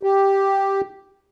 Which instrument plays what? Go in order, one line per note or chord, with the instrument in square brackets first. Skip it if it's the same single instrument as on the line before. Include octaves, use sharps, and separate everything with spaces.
[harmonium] G4